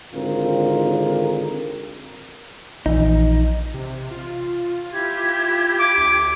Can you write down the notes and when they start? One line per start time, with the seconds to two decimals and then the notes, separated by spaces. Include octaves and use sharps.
0.13 G#1 D3 C4 F4 A#4
2.86 A#1 E3 D#4
3.74 C3
4.11 F4
4.92 E4 G4 G#6
5.79 D6
5.97 D2